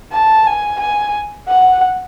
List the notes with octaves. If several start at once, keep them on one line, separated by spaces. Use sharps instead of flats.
A5
G#5
G#5
F#5